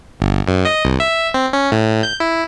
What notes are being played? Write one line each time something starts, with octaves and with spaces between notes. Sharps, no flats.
G1
F#2
D#5
C2
E5
C4
C#4
A2
G6
E4